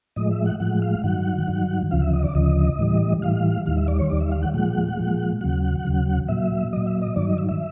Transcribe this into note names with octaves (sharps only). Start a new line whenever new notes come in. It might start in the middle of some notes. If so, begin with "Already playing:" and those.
A2 F3 G#3 D#5
E5
F#5
A2 F3 G#3 F#5
F5
G2 D#3 F#3 F#5
G2 D#3 F#3
D2 C#3 F3 F5
E5
D#5
D5
D2 C#3 F3 D#5
A2 E3 G3
A2 E3 G3 F5
D#2 D#3 G3 F5
E5
D5
C#5
D#2 D#3 G3 D5
E5
F5
F#5
A#2 F3 G#3 F#5
A#2 F3 G#3
D#2 C#3 F#3 F#5
D#2 C#3 F#3
A#2 F#3 E5
A#2 F#3 D#5
E5
D#5
G2 D#3 F#3 D5
D#5
E5
E5